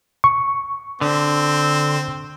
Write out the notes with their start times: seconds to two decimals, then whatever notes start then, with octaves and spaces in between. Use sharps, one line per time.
0.24 C#6
1.01 D3 C4